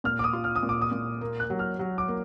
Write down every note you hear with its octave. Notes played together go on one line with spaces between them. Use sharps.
A#2 F6
D6
D#6
F4
F6
D#6
A#2
D6
D#6
A#2
A#3
F#6
F#3
F6
F#3
D6
A#3